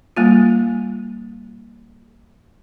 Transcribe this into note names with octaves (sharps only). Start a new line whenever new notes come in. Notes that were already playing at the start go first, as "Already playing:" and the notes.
G3 A#3 F4